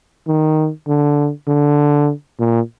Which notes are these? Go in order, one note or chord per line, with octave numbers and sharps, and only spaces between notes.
D#3
D3
D3
A#2